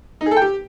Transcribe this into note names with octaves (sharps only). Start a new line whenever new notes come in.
D#4
G#4
A4
G5
G4